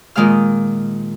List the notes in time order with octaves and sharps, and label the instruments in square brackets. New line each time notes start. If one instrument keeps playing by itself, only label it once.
[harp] A#2 D#3 G#3 F5 F6